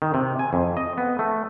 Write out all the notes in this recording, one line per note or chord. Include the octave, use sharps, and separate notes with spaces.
D#3
C3
G#5
F2
D#5
B3
A3